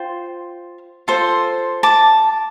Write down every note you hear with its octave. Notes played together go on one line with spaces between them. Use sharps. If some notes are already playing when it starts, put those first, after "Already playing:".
Already playing: F4 C5 G5
F4 A4 C5
A5 D6